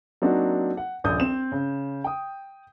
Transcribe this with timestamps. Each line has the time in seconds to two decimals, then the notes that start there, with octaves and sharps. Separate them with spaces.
0.22 F#3 A#3 C4 D4 D#4 F#4
0.77 F#5
1.04 D#1 A#1 D#6 G6
1.20 C4 E7
1.52 C#3
2.04 G5 D#6